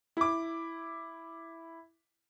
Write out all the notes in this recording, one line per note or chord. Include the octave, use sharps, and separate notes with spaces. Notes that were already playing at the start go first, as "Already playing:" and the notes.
E4 D6